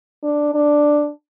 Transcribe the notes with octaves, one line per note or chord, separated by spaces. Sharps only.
D4
D4